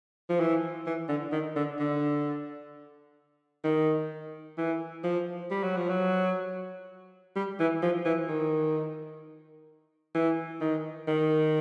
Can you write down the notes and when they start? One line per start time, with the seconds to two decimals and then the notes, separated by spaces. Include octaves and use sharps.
0.30 F3
0.40 E3
0.86 E3
1.09 D3
1.32 D#3
1.56 D3
1.79 D3
3.64 D#3
4.58 E3
5.04 F3
5.51 G3
5.63 F#3
5.76 F3
5.89 F#3
7.36 G3
7.60 E3
7.83 F3
8.05 E3
8.29 D#3
10.15 E3
10.61 D#3
11.08 D#3